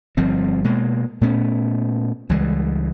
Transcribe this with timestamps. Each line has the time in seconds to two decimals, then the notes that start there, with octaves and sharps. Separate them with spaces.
0.17 G1 F3 G3 C4
0.64 B2 G#3 A#3
1.21 A#2 A3 B3 C#4
2.29 C#2 E3 G3 G#3